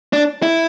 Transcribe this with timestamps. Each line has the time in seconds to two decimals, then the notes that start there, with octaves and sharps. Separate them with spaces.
0.13 D4
0.43 E4